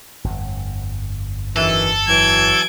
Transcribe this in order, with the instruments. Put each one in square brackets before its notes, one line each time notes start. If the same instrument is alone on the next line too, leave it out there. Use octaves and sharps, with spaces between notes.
[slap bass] G1 F2
[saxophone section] F#2 D#3 E3 [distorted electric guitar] A4
[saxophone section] E3 F#3 [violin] G#6 D7